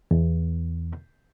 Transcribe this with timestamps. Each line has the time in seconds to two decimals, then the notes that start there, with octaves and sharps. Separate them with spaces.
0.11 E2